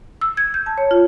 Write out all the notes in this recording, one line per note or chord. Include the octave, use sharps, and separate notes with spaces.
E6
G#6
G6
A5
C#5
F4